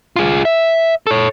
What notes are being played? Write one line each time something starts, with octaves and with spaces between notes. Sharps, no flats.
F4 G#4
E5
A4 C#5